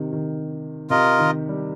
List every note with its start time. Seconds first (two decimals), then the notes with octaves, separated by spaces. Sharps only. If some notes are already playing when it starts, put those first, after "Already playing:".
Already playing: C3 D#3
0.13 D#3
0.90 C3 F4 A#4 D#5
1.19 D#3
1.49 G3